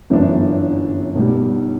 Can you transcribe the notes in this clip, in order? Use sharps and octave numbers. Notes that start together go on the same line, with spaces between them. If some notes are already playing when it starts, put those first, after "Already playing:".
G1 F#2 E3 B3 D4
B1 B2 G3